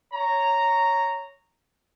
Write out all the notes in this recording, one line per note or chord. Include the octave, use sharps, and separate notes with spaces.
C#5 A#5